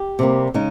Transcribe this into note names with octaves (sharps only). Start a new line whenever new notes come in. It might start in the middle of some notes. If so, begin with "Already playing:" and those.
Already playing: G4
C3 G3 A#3
C#3 G#3 D#4